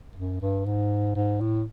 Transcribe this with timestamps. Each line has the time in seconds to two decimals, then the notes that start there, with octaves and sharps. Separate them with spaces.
0.16 F#2
0.41 G2
0.66 G#2
1.15 G#2
1.41 A2